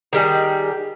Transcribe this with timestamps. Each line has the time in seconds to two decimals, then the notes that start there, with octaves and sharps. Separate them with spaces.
0.13 D#3 G3 G#4